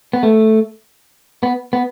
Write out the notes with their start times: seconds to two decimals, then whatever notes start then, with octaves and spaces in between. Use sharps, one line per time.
0.13 B3
0.23 A3
1.43 B3
1.73 B3